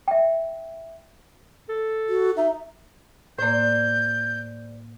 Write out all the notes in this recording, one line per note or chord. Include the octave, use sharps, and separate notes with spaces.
E5 G5
A4
F#4
D#4 E5
A2 A#3 C5 D5 G6